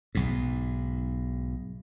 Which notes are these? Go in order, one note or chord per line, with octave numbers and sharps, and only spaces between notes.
B1 G#2